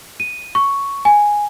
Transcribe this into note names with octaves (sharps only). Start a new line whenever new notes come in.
D#7
C#6
G#5